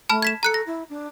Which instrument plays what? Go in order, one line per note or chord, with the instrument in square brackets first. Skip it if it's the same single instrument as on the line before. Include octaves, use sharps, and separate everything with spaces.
[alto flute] A3 [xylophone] A5 B5 F6
[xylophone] G#6 B6 E7
[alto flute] A4 [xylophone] A#5 F#6 C#7
[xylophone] A#6
[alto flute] E4
D4